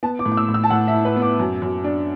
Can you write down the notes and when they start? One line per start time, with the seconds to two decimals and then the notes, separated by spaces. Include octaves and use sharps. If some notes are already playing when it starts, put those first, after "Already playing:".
0.03 B3 A5
0.19 D6
0.26 A2
0.32 D6
0.37 E6
0.48 A2
0.54 E6
0.64 A5
0.70 A2 F#5
0.88 E5
0.94 E4
1.05 B4
1.16 B3
1.22 D6
1.39 F#2
1.62 F#2
1.84 D4